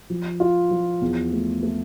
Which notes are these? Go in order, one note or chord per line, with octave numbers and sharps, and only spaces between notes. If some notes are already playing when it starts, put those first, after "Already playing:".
F3
F4
F3
E2
A3
A3